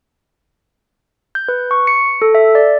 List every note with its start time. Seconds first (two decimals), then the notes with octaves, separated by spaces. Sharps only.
1.35 G6
1.48 B4
1.71 C#6
1.87 C#7
2.22 A4
2.35 E5
2.55 D5